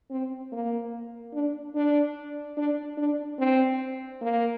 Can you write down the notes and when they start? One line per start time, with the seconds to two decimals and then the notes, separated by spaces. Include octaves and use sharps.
0.11 C4
0.52 A#3
1.33 D4
1.75 D4
2.57 D4
2.97 D4
3.38 C4
4.21 A#3